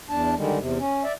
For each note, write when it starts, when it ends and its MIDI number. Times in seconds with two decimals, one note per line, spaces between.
0.10 0.34 40
0.10 0.34 62
0.10 0.34 81
0.37 0.58 50
0.37 0.58 51
0.37 0.58 55
0.37 0.58 56
0.58 0.78 40
0.58 0.78 48
0.79 1.03 61
1.04 1.12 74
1.04 1.12 76